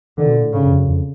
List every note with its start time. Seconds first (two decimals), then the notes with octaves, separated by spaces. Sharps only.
0.18 D3 D#3
0.26 B2
0.35 A#2
0.44 A2
0.52 G#2 C#3
0.65 G2
0.71 F2
0.77 F#2
0.88 F2